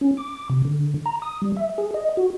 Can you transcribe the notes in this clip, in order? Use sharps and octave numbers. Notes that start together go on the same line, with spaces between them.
C#4
D6
C3
D3
A#5
D#6
G3
E5
G#4
D#5
F#4